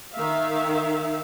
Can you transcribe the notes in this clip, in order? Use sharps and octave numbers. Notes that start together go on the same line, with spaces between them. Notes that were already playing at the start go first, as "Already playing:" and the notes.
D#3 E5 F5